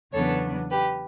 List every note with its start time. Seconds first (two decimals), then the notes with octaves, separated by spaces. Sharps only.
0.13 E2 C#3 F#3 B3 D4 A4 C#5
0.70 G4 B4